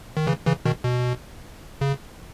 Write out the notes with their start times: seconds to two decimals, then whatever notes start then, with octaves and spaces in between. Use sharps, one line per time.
0.17 D#3
0.27 C#3 E3
0.46 C#3 E3
0.65 B2 D#3
0.84 B2
1.81 C#3